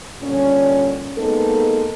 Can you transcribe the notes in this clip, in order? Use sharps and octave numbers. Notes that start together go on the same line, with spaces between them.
A#2 D3 G3 C#4
G#3 A#3 B3 D#4 A4